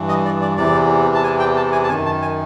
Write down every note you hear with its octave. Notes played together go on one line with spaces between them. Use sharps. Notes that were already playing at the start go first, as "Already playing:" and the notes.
Already playing: G2 E3
D#5
D5
D5
E2 C3 E3 D5
A5
G#5
G5
A5
G#5
A5
F#2 D#3 G#5
A5
G#5